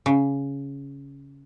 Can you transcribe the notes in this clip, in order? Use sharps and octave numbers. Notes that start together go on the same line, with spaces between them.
C#3